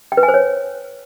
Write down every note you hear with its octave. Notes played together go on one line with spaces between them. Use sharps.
G5
B4
G#5
C5
C#5